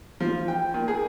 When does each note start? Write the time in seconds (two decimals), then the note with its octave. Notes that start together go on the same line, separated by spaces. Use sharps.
0.20 F3
0.48 G5
0.74 A#2
0.88 G#4